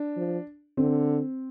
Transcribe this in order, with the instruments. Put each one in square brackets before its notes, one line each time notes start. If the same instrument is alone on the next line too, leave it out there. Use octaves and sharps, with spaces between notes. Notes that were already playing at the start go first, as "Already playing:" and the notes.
Already playing: [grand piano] D4
[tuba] F3
[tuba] D3 [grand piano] C4